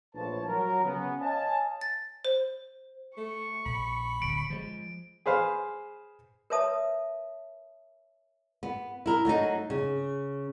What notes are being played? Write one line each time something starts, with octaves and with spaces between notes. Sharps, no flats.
A#1 A2 F3 B4 C#5 A5
F#3 A#4
C#3 B3
C#5 D#5 F5 G#5 A5
A6
C5
A3 C#6
A#1 B5
D1 D7
F3 F#3 G#3
G#4 B4 C5 F5
A#4 B4 C#5 E5 A5 D#6
B3
E4 A#4
F#3 A3 B3 D#4
C#3